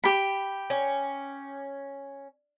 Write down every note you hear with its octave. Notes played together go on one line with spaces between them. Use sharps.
G4 B5
C#4